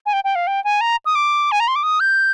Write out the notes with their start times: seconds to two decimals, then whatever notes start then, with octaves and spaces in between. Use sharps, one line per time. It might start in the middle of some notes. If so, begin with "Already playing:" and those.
0.06 G#5
0.13 G5
0.24 G5
0.35 F5
0.47 G5
0.64 G#5
0.81 A#5
1.06 D#6
1.15 D6
1.52 G#5
1.60 A#5
1.68 C6
1.76 D6
1.83 D#6
2.00 G6